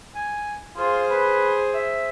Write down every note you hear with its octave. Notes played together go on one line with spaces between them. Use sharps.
G#5
F4 G#4 C5
B4
E5